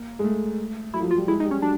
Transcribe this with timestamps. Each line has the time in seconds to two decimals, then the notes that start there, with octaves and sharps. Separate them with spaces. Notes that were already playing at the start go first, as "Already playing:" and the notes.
Already playing: A#3
0.19 G#3
0.24 A3
0.94 F#3 E4
1.00 F3
1.05 F#3
1.11 F4
1.17 G3
1.28 G#3 E4
1.40 D#4
1.45 G3
1.51 C#4
1.62 F#3 D4